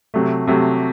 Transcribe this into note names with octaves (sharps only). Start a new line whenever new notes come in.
C3 F#3 A3
C3 F#3 A3